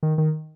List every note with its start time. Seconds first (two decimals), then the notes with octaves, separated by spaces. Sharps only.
0.03 D#3
0.18 D#3